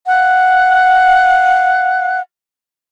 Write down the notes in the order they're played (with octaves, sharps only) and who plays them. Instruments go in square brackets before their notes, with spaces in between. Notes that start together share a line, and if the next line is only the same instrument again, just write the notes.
[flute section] F5 F#5 F#6